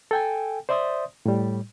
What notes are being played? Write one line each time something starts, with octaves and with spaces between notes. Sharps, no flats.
A4 G5 G#5
C5 D5 E5 C6 D#6
A2 G3